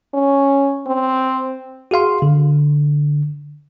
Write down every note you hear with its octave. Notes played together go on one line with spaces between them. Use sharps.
C#4
C4
F#4 G#4 F5 C6
D3